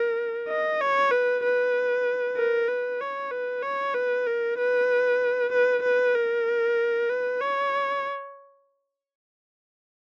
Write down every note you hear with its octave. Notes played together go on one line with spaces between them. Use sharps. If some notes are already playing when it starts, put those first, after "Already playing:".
Already playing: A#4
D#5
C#5
B4
B4
A#4
B4
C#5
B4
C#5
B4
A#4
B4
B4
B4
A#4
B4
C#5